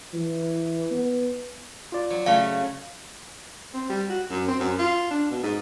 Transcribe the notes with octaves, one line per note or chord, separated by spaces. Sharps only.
E3
B3
F4 D5
F#3
C#3 A3 C#4 F5
C4
G3
F#4
F#2
C4
F#2
F4
D4
B2
G#2